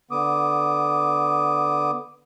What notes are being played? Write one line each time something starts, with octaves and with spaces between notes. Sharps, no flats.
D3 B3 D6 D#6